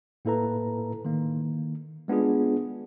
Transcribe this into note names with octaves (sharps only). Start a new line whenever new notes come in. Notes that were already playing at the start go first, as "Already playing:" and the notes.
A2 A#3 E4 A4 B4 A#5
D#3 A#3
G#3 B3 D4 F4 G#4